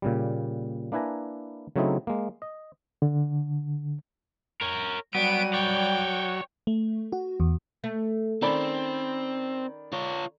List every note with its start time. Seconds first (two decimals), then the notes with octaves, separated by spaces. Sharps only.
0.02 A#2 C#3 G3
0.92 A#3 D4 E4 B4 G#5 A#5
1.76 C#3 F#3 A3 C4 D#4 E4
2.07 G#3 A#3
2.42 D#5
3.02 D3
4.61 A#4 C#5
5.15 F#3 G3 B3 D7 D#7
5.54 C#5 D5 G5
6.67 A3
7.12 F#4
7.40 E2
7.84 A3
8.42 D#3 C4 C#4 D5 B5
9.93 F4 C#5